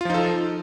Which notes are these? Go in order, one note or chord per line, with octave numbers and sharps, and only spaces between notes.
F3 D#4 F4 A4